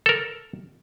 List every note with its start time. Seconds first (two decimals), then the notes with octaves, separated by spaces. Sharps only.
0.06 A4 A#4